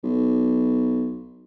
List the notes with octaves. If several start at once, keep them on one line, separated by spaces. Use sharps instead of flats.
B1